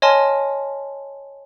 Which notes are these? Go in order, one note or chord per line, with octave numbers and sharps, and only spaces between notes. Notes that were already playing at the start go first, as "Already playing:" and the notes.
C#5 D#5 G#5 A5 C6 F6